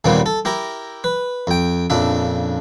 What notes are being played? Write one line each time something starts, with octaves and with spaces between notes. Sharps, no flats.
D#2 A#2 C#3 G3 B3 C4
A4
E4 G4 A#4
B4
F2 G5
A#1 F2 C#3 D4 E5